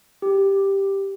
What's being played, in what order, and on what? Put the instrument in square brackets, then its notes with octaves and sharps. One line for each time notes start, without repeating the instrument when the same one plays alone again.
[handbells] G4